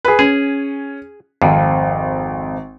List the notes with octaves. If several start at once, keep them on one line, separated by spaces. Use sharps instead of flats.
G#4 B4
C#4 G#4
G#1 F2